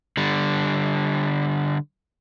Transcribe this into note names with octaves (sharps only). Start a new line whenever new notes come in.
D3 G3